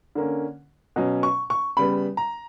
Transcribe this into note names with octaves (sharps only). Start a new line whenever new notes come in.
D3 A#3 C#4
B2 F#3 C#4
C#6
C#6
C#3 G3 B3 B5
A#5